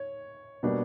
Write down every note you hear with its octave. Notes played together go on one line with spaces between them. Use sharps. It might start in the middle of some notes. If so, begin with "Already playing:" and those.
Already playing: C#5
B2 G3 A#3 D4